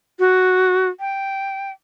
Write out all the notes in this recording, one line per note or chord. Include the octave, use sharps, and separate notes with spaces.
F#4
G5